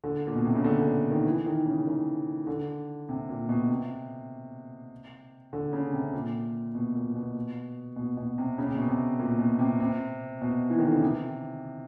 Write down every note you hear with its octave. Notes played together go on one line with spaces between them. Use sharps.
D3
A#2
B2
C3
C#3
D3
D3
D#3
E3
D#3
C#3
D#3
D3
C3
A#2
B2
C3
D3
C#3
C3
A#2
B2
A#2
B2
B2
B2
C3
C#3
C3
B2
C3
A#2
B2
C3
C3
B2
E3
D#3
D3
C#3
C3